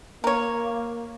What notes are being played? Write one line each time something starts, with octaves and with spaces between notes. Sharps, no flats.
A#3 A#4 C#5